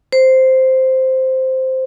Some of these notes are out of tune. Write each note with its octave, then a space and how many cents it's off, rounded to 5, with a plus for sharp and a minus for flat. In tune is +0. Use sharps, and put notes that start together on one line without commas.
C5 -5